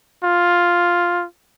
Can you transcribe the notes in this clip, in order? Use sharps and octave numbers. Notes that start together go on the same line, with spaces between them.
F4